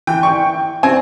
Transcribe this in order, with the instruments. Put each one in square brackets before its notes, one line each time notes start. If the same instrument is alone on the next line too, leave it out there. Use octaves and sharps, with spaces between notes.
[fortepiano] E3 [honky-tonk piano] G5
[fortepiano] C#6
[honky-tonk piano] C4 [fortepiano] G#5